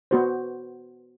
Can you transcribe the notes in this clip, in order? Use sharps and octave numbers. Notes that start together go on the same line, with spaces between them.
B3 F#4 C5